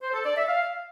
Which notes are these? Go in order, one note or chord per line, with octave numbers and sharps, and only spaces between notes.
C5
A4
D5
E5
F5